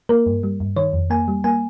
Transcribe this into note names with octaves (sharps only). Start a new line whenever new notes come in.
A#3 A#4
G2
G3
G2
D#3 C#5
F2
A#3 G#5
G3
A#3 G#5